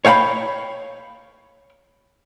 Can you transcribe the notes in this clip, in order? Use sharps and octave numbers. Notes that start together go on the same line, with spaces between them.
C#5 F5 G5 A#5 B5